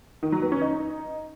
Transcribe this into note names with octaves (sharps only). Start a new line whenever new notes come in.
D#3
F#3
B3
C#4
D#4